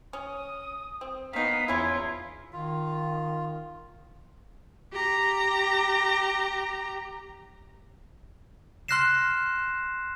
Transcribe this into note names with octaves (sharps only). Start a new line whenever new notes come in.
C#4 D#6
C4
D#3 B3 D#4 F5 B6
E2 C#4 E4 F4 G#6
D#3 F4
G4 A#5
C6 F6 F#6 A#6 C7 E7